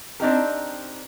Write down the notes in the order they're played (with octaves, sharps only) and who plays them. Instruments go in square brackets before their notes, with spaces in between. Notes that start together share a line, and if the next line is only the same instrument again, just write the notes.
[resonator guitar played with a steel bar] C4 D4 D#4 G4 A#4